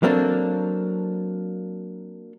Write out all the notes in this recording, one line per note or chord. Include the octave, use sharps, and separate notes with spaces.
F#3 A#3 C4 D4 A4